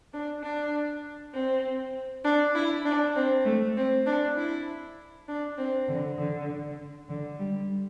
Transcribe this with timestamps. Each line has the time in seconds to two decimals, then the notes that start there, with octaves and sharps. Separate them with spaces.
0.13 D4
0.42 D4
1.33 C4
2.24 D4
2.54 E4
2.84 D4
3.15 C4
3.45 A3
3.76 C4
4.05 D4
4.36 E4
5.27 D4
5.57 C4
5.88 D3
6.17 D3
7.08 D3
7.39 G3